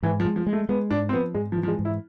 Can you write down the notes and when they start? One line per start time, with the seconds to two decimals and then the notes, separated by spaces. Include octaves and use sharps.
0.03 G#2 E3
0.20 F3
0.25 G#3
0.36 F3
0.47 G#3
0.53 A3
0.69 G#3 B3
0.91 G#2 D4
1.09 C4
1.13 F3 B3
1.34 G#2 G#3
1.52 F3
1.57 E3
1.63 F3
1.68 G#3
1.79 G#2
1.85 E4